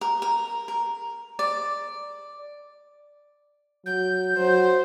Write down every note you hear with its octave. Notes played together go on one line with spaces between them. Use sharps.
A#4
A#4
A#4
D5
F#3 G6
F#3 C5